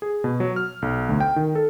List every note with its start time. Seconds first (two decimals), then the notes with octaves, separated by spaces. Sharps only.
0.02 G#4
0.24 B2
0.40 F#3
0.56 F6
0.82 B1
1.09 D2
1.20 G5
1.36 D#3
1.55 A4